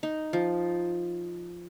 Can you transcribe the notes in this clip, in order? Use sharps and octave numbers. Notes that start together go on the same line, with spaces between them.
D#4
F3